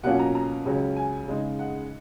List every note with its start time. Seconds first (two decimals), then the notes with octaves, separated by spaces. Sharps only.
0.03 B2 F#3 A#3 C#4 F4 F#5
0.19 A#5
0.35 A#5
0.65 C#2 C#3 F#3 C#4
0.96 G#5
1.28 C#3 G#3 D#4
1.59 F#5